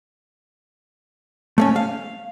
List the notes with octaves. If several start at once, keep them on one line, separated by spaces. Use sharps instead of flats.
A3 A#3 C#4
F5